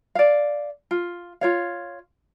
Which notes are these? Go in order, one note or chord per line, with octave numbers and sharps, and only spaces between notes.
D5 F5
F4
F4 C#5 F5